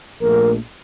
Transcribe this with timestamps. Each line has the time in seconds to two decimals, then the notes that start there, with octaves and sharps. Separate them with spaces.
0.22 A#1 A#2 A3 A#4